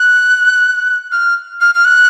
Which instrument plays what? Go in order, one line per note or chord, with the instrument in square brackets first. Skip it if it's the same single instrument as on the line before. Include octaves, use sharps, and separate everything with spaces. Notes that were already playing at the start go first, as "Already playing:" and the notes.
Already playing: [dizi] F#6
F6
F6
F6
F#6